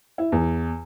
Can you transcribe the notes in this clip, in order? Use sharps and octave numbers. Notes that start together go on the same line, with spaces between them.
E4
E2